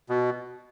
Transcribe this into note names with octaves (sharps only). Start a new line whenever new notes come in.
B2